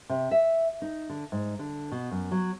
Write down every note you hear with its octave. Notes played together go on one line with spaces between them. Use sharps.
C3
E5
D#4
D3
G#2
D3
B2
F#2
F#3